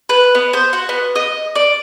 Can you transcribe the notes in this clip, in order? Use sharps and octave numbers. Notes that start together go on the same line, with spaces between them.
B4
B3
C5
F#4
B3
D#5
D5